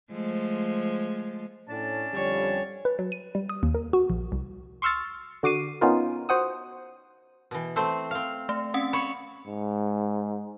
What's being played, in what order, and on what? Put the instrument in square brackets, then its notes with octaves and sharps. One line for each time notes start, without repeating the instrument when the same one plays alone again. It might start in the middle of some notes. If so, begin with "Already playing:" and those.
[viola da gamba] F3 G#3 A3
[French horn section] A2 [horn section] C#4 D4 A5
[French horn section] F2 D3 G3 [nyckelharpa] C#5
[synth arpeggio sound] B4
F#3
D#7
G3
D#6
D#2
A#4
F#4
A#1
C2
[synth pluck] C6 C#6 E6 F6 A6
D3 F#4 D6 C7 D#7
B3 C#4 D#4 F4 A#4
F#4 C5 F#5 D#6
[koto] B2 E3
A3 C4 C5
C4 F5
[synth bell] A3
C4 C#4 F#5
[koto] C#5 [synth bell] B5 C#6 C#7
[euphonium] G#2